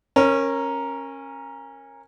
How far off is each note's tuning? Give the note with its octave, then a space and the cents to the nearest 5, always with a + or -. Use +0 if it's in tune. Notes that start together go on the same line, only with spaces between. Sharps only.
C#4 -20 A#4 +0